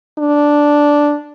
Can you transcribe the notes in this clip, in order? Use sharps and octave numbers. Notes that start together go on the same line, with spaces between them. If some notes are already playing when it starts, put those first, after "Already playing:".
D4